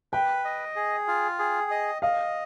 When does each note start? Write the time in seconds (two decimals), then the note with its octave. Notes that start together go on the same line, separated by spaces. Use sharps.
0.13 B4 G5
0.45 D#5
0.76 G#4
1.08 F4
1.39 G#4
1.71 D#5
2.02 D#5 F5